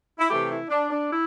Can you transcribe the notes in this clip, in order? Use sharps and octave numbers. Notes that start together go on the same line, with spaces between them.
E4
C3 E3 A3 G4
E4
D4
D4
E4